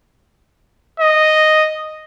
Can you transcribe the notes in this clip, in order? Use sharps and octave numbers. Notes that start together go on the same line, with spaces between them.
D#5